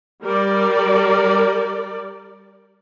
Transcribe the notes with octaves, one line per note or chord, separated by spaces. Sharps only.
G3 A#4 D5